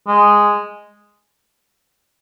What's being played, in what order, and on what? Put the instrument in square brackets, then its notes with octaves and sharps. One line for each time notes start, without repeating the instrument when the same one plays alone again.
[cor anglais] G#3